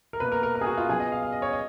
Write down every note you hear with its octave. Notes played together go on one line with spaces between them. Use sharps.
A#4
B2 A#3 B4
A#4
A#4
A#4
G#4
F#4
F4
B2 F#3 B3 G#4
D#5
F5
F5
D#5
C#5
D#5